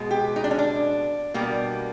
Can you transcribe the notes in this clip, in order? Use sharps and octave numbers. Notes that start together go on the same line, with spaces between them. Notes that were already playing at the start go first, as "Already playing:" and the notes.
Already playing: B2 G#3
G4
D#4
D4
C#4
D4
B2 G3 A#3